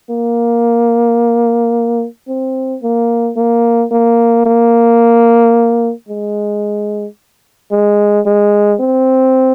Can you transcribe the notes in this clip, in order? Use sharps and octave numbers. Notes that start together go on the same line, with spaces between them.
A#3
C4
A#3
A#3
A#3
A#3
G#3
G#3
G#3
C4